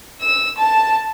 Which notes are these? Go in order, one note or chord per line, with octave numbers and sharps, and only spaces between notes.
E6
A5